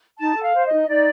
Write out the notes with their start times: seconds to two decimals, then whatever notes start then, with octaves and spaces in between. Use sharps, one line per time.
0.20 D#4 A5
0.36 A4
0.43 F5
0.54 C5
0.66 D#5
0.72 D#4
0.88 D#4 D5